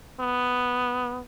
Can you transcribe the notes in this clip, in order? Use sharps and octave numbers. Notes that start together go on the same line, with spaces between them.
B3